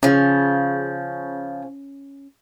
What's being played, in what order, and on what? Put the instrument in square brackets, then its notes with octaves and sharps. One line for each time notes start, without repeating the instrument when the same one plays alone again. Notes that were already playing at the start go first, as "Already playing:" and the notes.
[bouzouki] C#3 F3 [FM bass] C#4